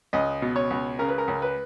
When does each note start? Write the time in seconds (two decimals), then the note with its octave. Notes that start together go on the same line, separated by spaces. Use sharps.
0.13 C#2 D#5
0.42 B2
0.56 C#5
0.70 C#2
0.99 C#3 A#4
1.08 B4
1.18 A#4
1.28 C#2
1.42 B4